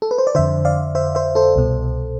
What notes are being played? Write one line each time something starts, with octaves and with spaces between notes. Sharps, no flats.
A4
B4
C5
D5
F2 D3 C5 E5
D5 F5
C5 E5
C5 E5
A4 C5
C2 B2